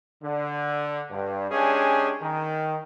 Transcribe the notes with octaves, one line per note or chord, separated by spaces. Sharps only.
D3
G2
G#3 C#4 D4 G4 G#4
D#3